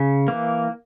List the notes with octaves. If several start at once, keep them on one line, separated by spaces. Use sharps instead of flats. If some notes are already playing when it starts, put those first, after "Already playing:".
Already playing: C#3
E3 A#3